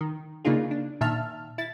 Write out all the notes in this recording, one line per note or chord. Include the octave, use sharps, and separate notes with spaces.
D#3
C#3 A#3 D4 D#4 F4 G#4
D4
A#2 D#3 E5 A5 F6
E4 A6